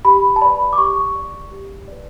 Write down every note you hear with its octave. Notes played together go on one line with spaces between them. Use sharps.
G4 B5
A5
B4 D5 B5
D6
G4 C#6
D5
G4
B4 D5